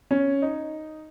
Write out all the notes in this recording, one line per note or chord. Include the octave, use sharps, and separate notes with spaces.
C#4
D#4